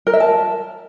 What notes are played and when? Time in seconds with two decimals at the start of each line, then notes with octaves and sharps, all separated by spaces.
0.07 A#4
0.13 E5
0.20 A5